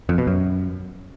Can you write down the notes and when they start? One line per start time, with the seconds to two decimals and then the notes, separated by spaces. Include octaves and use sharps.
0.09 F2
0.18 B2
0.27 F#2